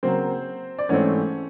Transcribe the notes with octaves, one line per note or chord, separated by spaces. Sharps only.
C#3 F#3 A#3 C4 C5
D5
G#2 E3 A3 C4 C#4 C#5